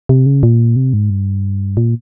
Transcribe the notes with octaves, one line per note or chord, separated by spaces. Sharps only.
C3
C#3
A#2
C3
G#2
G2
A#2